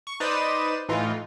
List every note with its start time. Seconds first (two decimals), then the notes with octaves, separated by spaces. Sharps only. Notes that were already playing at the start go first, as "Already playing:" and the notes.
0.07 C#6
0.20 D#4 B4 C5 D5 D#6 E7
0.88 A2 E3 D#4 F4